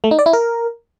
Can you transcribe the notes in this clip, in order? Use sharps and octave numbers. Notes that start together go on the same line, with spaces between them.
A3
D#4
D5
E4
A#4